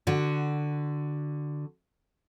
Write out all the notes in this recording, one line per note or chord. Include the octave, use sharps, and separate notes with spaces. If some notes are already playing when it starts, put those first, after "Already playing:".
D3 F#4